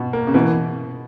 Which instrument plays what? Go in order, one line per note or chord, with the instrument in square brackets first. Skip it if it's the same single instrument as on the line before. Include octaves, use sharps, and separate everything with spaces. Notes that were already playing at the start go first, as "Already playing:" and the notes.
Already playing: [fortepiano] B2
[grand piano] A#3
[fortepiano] C#3
[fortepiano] B2 [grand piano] E3